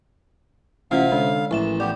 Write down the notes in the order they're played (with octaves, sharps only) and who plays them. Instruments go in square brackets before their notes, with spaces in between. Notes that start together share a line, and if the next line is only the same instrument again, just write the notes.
[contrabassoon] A1 [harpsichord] C3 [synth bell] C#4 F4 F#5 [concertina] F5
[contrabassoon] D3 [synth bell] G#3
[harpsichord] A1 [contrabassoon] E3 [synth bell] F3 E5 E7
[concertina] B3 G4 [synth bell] D5